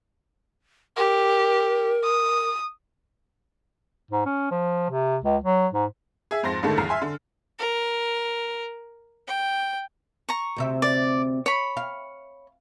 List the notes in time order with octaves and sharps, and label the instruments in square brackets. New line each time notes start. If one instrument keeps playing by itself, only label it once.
[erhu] G4 [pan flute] A#4
[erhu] D#6
[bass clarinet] G#2
C#4
F3
C3
C#2
F#3
G#2
[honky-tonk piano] G#4 E5
F2 G#2 C4 C6 A6 A#6
A1 G#2 D3 D#3 A3 A4
G1 E2 A#5 F6 C7
E5 G#5 C6
D3
[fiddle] A#4
G5
[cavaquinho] A#5 C#6
[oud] D2 C3 E5
[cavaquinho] D5
C#5 B5
[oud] F5